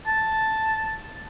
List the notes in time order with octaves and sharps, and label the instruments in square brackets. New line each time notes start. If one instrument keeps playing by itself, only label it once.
[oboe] A5